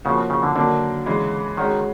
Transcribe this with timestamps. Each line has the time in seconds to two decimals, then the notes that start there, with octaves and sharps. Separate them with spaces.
0.05 C#3 F3 A#3 C#4 F#4
0.30 C#3
0.43 D3
0.55 D3 D#3 F#3 A#3 D4
1.06 C#3 E3 G#3
1.57 D#3 G#3 C#4 F#4